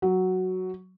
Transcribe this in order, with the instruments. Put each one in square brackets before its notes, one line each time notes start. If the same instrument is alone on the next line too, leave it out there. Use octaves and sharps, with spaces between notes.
[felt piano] F#3